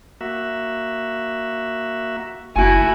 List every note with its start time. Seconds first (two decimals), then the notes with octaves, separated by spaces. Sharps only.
0.21 A#3 F#4 E5
2.56 F#1 A3 E4 F#4 G#5